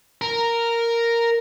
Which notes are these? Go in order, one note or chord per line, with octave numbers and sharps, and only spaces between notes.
A#4